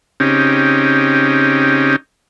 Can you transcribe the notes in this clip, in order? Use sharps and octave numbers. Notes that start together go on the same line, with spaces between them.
C#3 C4 C#4 D#4 G4